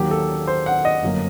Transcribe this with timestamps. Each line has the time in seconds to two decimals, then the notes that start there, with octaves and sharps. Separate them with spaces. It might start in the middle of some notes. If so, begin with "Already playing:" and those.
Already playing: D#2 D#3 F#3 A#3 G4
0.11 A4
0.47 C5
0.66 F#5
0.85 D#5
1.02 G1 F#2 F#3 A#3